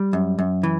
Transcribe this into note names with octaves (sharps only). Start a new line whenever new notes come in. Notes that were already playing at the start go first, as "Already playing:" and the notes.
Already playing: G3
F#2
F#2
E3